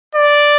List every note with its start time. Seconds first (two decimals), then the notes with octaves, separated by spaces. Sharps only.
0.15 D5